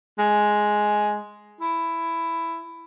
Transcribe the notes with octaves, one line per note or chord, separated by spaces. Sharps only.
G#3
E4